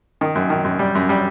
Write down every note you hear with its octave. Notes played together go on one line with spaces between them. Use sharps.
D#3
F#2
D#3
F#2
G3
F#2
G3